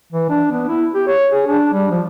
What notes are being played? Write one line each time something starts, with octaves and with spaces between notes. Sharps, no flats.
E3
D4
B3
E4
G4
C#5
G#4
D4
G3
F3